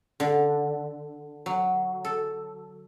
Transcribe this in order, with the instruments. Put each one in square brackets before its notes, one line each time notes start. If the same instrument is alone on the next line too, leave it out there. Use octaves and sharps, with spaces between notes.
[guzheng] D3
F#3
A4